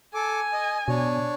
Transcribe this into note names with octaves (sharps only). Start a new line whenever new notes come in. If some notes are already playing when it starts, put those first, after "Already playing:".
A4 G#5 D6
D#5
B2 D4 C#5